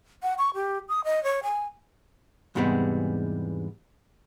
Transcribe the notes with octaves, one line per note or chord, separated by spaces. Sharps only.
F#5
C#6
G4
D#6
D#5
C#5
G#5
E2 G#2 C3 G3 G#3 B3